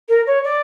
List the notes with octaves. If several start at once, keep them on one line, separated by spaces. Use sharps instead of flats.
A#4
C#5
D5